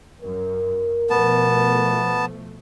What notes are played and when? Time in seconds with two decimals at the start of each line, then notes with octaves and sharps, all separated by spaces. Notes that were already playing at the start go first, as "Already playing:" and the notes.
0.22 F#2 A#4
1.10 B2 F3 A3 B3 A5